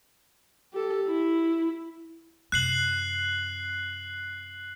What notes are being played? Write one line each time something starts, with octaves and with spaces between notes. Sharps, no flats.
G4 A4
E4
F#2 C3 F#6 C7 F#7